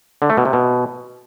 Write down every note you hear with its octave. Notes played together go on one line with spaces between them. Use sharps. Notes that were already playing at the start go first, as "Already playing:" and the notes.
D3
A3
B2
C3
B2